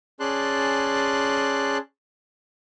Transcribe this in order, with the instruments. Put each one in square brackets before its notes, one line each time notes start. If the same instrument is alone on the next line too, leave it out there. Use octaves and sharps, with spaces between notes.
[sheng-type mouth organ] C#4 G#4 D5 A5 C6 F#6